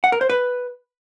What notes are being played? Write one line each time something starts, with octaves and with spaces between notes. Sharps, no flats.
F#5
A#4
C5
B4